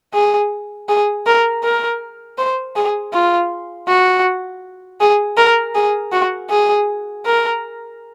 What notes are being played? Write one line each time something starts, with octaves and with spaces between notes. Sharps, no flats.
G#4
G#4
A#4
A#4
C5
G#4
F4
F#4
G#4
A#4
G#4
F#4
G#4
A#4